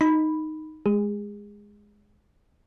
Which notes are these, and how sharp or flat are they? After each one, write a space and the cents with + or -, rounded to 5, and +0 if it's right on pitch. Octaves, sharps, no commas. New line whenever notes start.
D#4 +0 B5 +0
G#3 +0 G#4 -30